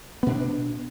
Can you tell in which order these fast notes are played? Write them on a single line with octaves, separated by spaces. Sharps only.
B3 B2 D4